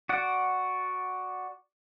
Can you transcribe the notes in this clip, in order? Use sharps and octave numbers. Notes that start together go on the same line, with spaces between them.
F#4 D5 F#5